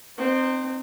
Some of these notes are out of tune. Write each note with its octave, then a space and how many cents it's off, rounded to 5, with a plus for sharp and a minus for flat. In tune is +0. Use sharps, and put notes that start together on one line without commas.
C4 +0 D#4 -35